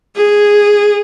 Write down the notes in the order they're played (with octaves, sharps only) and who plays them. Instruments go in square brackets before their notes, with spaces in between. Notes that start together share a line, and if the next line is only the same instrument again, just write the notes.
[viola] G#4